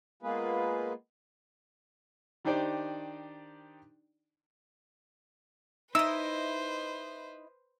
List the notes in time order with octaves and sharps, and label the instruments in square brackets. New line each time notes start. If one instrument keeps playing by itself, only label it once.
[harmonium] G#3 A#3 B3 F4 G#4 B4
[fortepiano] D#3 D4 D#4 G4 C5 D5
[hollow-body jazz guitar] D#4 [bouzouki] E4 D#5 [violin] B4 C5 [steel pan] E6